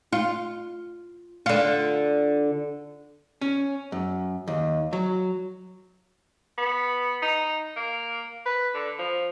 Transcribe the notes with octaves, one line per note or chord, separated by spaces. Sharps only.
F4
D3 F4
C#4
F#2
D#2
F#3
B3
D#4
A#3
B4
D3
F3